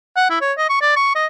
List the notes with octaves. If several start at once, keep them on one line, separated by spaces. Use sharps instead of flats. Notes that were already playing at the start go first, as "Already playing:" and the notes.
F#5
E4
C#5
D#5
C#6
D5
C#6
D#5